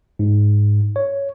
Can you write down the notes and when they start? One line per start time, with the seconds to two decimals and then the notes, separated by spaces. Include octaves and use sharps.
0.19 G#2
0.96 C#5